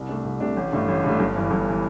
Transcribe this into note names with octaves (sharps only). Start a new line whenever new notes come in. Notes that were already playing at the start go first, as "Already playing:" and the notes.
Already playing: C2
C3 A3 D4
C2
C3 A3 D4
A1
G2 D3 A3
A1
G2 D3 A3
G1
G2 E3
G1
E3